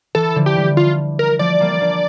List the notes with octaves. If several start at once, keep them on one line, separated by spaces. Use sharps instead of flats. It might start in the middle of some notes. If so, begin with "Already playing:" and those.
E3 A4
D3 F3
G4
E3 G3
F4
A#4
F3 A3 D5
G3 A#3
A#3 D4